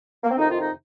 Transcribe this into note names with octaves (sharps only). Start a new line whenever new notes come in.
A#3
C4
F2 C3 D#3 D#4
F4
D#4